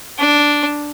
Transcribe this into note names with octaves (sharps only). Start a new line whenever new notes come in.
D4